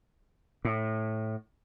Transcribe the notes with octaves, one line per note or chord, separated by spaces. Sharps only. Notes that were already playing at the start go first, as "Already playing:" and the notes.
A2